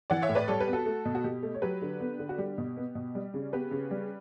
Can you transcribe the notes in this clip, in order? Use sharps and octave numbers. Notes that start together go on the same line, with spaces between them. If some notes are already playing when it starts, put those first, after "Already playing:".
E3 D5 F#5
C#5 E5
A2
B4 D5
G3 A4 C#5
G4 B4
B3
F#4 A4
A3
B2
F#4
B2 G4
A3
C#5
F#3 G4 B4
D3
B3
D3
F#4
G3 G4
B2
B3
B2
G3
C#3
B3 G4 B4
C#3
G3